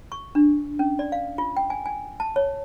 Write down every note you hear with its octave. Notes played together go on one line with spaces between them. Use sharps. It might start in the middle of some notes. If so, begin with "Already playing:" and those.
C#6
D4
C#4
D5
F5
F4
G5
G#5
G#5
A5
C#5